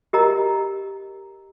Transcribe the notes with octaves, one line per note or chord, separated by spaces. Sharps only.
G4 A#4 D#5 A#5